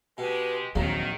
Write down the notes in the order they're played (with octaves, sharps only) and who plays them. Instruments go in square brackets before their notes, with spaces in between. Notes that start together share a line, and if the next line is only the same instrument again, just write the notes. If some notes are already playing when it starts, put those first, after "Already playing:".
[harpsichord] B2 [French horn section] G#3 G4 [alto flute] B4
[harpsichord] A#1 F#3 [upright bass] D#2 [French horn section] D#3 [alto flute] C4